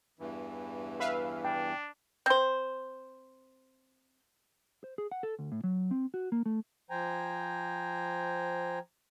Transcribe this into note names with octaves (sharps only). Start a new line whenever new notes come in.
E2 G2 E3
B4 E5 F5
D4 G5
C4 C5
C5
G#4
F#5
A4
D2
A2
F#3
C4
F#4
A#3
A3
F3 C5 G5 G#5 A#5